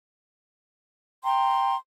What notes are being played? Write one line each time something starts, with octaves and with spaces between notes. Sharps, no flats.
G5 A#5 C6